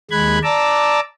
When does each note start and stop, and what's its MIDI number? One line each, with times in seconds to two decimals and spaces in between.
0.11 0.39 39
0.11 0.39 56
0.11 0.39 83
0.11 0.39 90
0.11 0.39 92
0.43 1.00 74
0.43 1.00 81
0.43 1.00 82
0.43 1.00 86
0.43 1.00 88